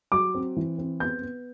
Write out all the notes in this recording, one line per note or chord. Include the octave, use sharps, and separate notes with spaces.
F#3 D6
C4
E3
C4
B3 G6
B3